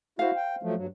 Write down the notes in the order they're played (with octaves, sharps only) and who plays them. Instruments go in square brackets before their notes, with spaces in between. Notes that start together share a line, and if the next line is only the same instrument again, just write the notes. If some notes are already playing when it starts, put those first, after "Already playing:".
[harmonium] E4 F#4 [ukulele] C5 F5
[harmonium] G5
F3 F#3 A3
G2 F#3